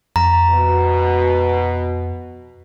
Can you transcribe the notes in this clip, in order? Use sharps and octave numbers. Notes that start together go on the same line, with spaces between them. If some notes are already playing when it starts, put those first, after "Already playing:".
F2 A#5
B2